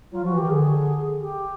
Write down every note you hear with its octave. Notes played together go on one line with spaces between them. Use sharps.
F#3 F4
F3 F#4
E3
D#3 G4
D3 G#4
G4